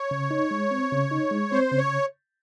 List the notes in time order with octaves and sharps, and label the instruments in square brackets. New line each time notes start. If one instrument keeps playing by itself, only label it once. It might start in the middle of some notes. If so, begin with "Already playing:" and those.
Already playing: [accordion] C#5
[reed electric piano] C#3
D#4
G#3
C4
C#3
D#4
G#3
[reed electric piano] C4 [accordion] C5
[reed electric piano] C#3
[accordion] C#5